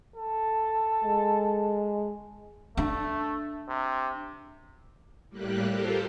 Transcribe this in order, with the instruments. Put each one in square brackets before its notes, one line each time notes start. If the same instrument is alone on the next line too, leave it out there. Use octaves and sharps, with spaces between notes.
[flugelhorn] A4
[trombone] G#3
[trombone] A3 [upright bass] D4
[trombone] C3
[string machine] A2 G3 A#3 G4 F#6
F4 G4 A4 A#4 C5